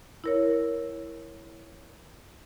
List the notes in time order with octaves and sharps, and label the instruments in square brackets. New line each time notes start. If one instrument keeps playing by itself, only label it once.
[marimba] E4 A#4 C#5